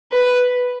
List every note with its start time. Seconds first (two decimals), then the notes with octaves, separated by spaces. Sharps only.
0.12 B4